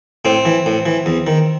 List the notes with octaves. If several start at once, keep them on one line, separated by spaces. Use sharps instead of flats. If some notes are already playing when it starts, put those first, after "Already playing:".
A2 C4
E3
A2
E3
E2
D#3